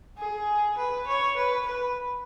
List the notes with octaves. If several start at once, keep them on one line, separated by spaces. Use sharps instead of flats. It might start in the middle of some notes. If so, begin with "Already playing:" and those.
G#4
B4
C#5
B4
B4